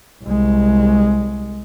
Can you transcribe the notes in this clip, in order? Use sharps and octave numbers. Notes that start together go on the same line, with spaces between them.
C2 G#3